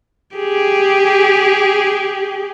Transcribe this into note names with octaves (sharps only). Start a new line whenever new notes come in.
G4 G#4